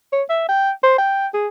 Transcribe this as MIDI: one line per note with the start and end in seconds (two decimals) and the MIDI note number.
0.13 0.23 73
0.29 0.45 76
0.49 0.71 79
0.83 0.97 72
0.98 1.27 79
1.34 1.48 68